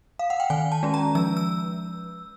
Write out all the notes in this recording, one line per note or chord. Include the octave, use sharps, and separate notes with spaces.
F5
F#5
G5
D#3 G#5
A5
G#3 C#4
A#5
F3 E6
E6